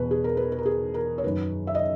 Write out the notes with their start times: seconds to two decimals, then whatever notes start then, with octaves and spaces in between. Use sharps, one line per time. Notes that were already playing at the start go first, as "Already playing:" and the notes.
Already playing: E2 B2 B4
0.11 G#4
0.24 A#4
0.37 B4
0.52 B4
0.58 A#4
0.66 G#4
0.94 A#4
1.18 C#5
1.24 F#2 D#3 B4
1.67 E5
1.75 D#5